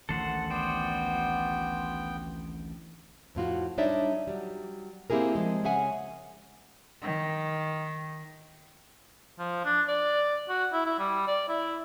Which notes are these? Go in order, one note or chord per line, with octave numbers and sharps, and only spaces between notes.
A1 D2 D#3 A4 C5 F#5
B3 F#4 C5 D5 G5
F2 A2 F4 F#4
G3 D4 D#4 C#5 D5 E5
F#3 G3
A#3 C4 E4 G4 G#4 A#4
F3 G#3
C#3 C#4 G#4 E5 F#5 G#5
D#3
F3
D4
D5
F#4
E4
E4
G3
D5
E4